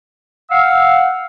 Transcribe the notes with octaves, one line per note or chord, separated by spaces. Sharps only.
F5 F#5 E6